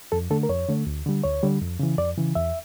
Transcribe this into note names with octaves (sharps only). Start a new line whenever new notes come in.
F2 A4
D3 A3 A4
A#4
F2 C#5
D3 A3
D2
D3 G3
D2 C#5
D3 G3
F2
C#3 E3
F2 D5
C#3 E3
E2 E5